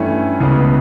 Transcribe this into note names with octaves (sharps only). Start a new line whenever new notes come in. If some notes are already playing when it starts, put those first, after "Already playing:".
Already playing: G2 E3 A3 C#4 E4
C#2 C#3 E3 B3